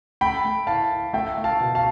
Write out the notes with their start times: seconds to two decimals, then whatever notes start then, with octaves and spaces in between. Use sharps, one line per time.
0.21 A3 G5 B5
0.45 A3
0.67 E4 F5 A5
0.90 E4
1.13 A3 E5 G5
1.37 A3
1.44 F5 A5
1.60 B2
1.75 F5 A5